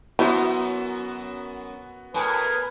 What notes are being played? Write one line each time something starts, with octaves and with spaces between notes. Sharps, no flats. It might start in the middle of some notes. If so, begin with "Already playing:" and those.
F#2 B3 E4 F#4 C5 E5
A2 A#4 B4 G#5